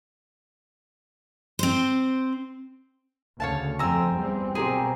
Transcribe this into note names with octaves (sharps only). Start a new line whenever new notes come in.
C4 C5
D2 C#3 C#5 F5 A5
F2 C4 G5 G#5 A#5 E6
E2 G3 C4
B2 G3 C4 G4 G#4 A#4 C5